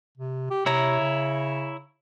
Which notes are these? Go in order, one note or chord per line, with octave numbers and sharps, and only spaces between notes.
C3
G4
C3 E4 C#5 A#5
C#3